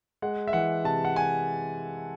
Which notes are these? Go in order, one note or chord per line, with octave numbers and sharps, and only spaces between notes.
G#3 F#5
E5
E3 F#5
C3 A5
F#5
G#5